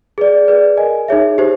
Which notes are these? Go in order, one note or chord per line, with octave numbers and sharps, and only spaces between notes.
G#4 B4 D5
G#4 B4 D5
A#4 D#5 G#5
D#4 G#4 C#5 E5
D#4 G4 C5